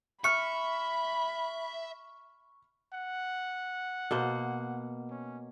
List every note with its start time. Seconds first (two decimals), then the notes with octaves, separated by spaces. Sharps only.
0.24 E5 B5 C#6 F6 C#7
2.93 F#5
4.11 B2 A#3 C5
5.10 C#4